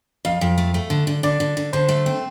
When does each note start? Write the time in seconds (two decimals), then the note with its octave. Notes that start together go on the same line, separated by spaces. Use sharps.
0.25 F2 F5
0.41 F2
0.58 A3
0.74 A3
0.90 D3
1.07 D3
1.23 D3 D5
1.40 D3
1.57 D3
1.73 D3 C5
1.89 A3
2.06 C4